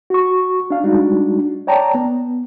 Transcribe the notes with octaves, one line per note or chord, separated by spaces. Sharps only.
F#4 C#6
D4 F5
G3 G#3 D4 D#4 F#4
C#5 D5 G5 A5 A#5
B3